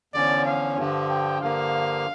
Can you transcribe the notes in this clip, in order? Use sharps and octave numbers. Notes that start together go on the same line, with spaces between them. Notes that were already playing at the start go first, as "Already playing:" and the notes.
E2 D3 F3 C#4 D5
F5
G2 D3 F3
G5
G2 D3 F3 A#3 F5